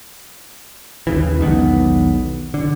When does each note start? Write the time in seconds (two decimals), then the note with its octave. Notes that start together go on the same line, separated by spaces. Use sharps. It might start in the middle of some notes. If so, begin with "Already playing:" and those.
1.07 D#2 C#3 E3
1.39 E1 B1 D#3 B3
2.54 D3